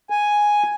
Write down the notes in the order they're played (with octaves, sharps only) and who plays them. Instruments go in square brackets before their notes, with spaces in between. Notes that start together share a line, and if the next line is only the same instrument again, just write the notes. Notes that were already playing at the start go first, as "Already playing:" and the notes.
[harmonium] G#5